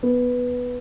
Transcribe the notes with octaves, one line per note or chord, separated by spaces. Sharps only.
B3